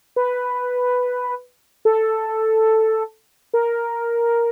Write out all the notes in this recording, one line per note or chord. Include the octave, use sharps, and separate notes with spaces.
B4
A4
A#4